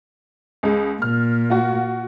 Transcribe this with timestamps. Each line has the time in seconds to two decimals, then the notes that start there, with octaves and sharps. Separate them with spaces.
0.63 C#2 G#3
1.02 A#2 F6
1.50 F4 F#4